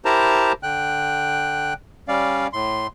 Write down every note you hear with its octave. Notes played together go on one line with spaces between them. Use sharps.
E4 G4 A#4 C5 A5 A#5
D3 G5 F#6
G3 C#4 D5 F5
A2 C6